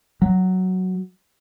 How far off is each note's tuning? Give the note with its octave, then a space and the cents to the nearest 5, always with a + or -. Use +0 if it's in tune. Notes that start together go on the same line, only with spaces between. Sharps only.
F#3 +5